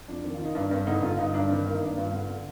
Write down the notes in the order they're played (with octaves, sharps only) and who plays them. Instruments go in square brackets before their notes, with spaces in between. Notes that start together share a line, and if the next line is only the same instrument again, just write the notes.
[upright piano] F2 D4
D#3 C4
F4
D#3
D#4
G2 D4
G2 C4
D3 D#4
D3 F4
G2 D#4
G2 D4
D#3 C4
D#3 A#3
D#4
G2 D4
G2 F4
D3
D3